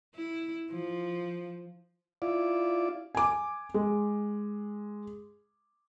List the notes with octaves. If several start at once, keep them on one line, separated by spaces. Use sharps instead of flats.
E4
F3
E4 F4 D5
G#5 D6
G#3